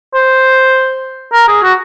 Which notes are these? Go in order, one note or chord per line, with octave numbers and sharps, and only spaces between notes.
C5
A#4
G#4
F#4